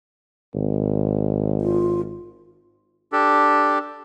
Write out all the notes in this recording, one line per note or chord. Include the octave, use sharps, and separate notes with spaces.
G#1
F4
D4 G4 A4